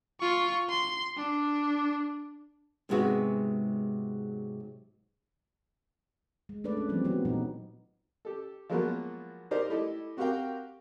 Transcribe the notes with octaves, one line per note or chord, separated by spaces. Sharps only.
F4 C#6
C6
D4
G#2 C3 F#3 G#3 B3 F#4
G#3
A3 D4 B4 D5
C#4
E3 F3 G3 C4
F#3 G#3 B3
A#2 E3 D#4
G4 A4
F3 F#3 G#3 A#3 B3 F#4
D#4 G4 A#4 C5 D5 D#5
A3 E4 G4 A4 D#5
C4 F#4 G4 A#4 F5 G5